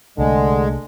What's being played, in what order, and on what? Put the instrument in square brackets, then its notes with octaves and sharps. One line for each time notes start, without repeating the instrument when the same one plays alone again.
[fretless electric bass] C2 A3 [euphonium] D3 [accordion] G#3